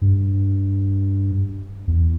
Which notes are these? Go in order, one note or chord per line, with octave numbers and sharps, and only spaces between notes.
G2
E2